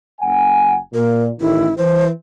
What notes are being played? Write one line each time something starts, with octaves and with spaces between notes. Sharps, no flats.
F#1 F#5 G#5
A#2 A#4
A1 D#3 E4
E3 C5